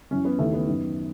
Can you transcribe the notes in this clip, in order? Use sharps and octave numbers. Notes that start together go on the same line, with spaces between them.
F#2 E3 C#4
B3
D#2 C#3 E3 A3
B3
F#2 D#3